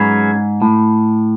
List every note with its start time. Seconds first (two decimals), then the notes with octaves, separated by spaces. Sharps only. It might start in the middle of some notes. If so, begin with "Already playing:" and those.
Already playing: G#2 F#3 C#4 G#4 B4
0.62 A2